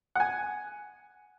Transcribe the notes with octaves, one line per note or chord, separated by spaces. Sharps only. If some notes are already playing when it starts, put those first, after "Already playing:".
F#5 G#5